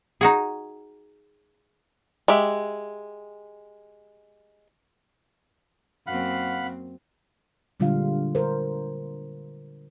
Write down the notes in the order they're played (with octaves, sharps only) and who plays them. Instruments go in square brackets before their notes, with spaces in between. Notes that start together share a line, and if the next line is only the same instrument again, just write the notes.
[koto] D#4 F#4 G#4
[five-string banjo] G#3 G4 E5
[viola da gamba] F#2 A#3 C4 [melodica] F5 F#5 B5
[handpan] A#2 D3 G3 G#3 F4 F5
A#4 C5